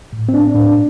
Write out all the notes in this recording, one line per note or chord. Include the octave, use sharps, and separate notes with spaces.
A2
C4
A2 D4
A2